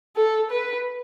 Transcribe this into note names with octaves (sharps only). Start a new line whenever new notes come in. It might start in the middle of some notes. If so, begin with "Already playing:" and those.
A4
B4